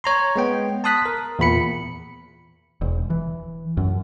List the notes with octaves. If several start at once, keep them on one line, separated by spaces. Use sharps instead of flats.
C#5 A#5 C6
G#3 B3 G5
A5 C6 D#6 F#6 B6
A#4
E2 A#2 B5 C#7
E1
E3
F#2